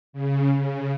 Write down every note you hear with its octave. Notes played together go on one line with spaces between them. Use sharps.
C#3
C#3